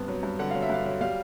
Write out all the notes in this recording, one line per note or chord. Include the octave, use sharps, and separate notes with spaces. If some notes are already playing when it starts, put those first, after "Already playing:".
Already playing: G2 B3 C4
F#3
G2
D3 F#5
F#3 F5
E5
G2 F5
F#3
G3 F5